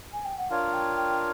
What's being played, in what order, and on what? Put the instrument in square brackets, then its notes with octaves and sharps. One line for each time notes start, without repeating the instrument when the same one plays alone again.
[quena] G#5
G5
F#5
[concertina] D4 F4 A#4 C#5 [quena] F5
[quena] G5
G5